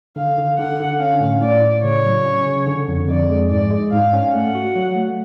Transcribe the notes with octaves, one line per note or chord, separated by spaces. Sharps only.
D3 F5
D3
D3 F#5
D3
C#4 F5
A2
A2 D5
A2
C#3 C#5
F#3
C#4
C#3
D3
F2
F2 D5
G#3
G#2 D5
G#3
G#2 F5
C#4
A3 F#5
F#4
F#3
A3